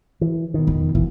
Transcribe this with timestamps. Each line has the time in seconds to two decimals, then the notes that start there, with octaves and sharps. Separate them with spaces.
0.21 E3
0.54 B2 D#3
0.67 F2
0.95 E1 A#1 E3